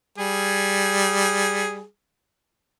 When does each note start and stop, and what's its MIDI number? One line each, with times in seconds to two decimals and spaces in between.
0.18 1.84 55
0.18 1.84 68